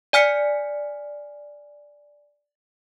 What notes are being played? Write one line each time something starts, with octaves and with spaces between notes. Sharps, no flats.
D5 G#5 F6 B6 C#7